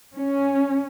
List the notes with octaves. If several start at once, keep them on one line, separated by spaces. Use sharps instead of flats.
C#4